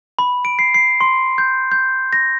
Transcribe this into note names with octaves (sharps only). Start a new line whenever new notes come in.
B5
D7
C7
C7
C6
G6
G6
A#6